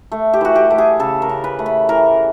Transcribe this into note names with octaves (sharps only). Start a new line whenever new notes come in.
A3
G4
E3 F#4
G4
A3
G#4
C#3 A4
A#4
C#3
B4
A3
B4
E3 A#4